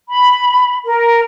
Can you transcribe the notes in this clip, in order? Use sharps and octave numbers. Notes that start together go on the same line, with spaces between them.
B5
A#4